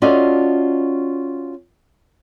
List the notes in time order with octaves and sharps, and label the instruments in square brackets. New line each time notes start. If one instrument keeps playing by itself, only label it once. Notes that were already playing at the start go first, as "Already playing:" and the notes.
[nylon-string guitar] C#4 F4 F#4 A4 D5 D#5